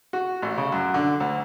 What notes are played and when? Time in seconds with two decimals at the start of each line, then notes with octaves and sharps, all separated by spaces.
0.13 F#4
0.42 A1
0.57 C#3
0.72 F#2
0.94 D3
1.20 D2